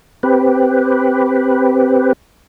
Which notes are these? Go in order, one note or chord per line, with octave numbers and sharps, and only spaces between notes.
C4 G4 B4